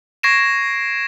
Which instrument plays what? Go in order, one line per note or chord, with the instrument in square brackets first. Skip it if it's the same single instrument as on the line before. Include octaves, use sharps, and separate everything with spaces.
[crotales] C#6 G#6 A#6 C7 D7 E7